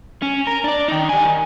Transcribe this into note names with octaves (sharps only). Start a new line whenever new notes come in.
C#4
A#4
D4 D5
D#3 D#4
G3 G#5
D#3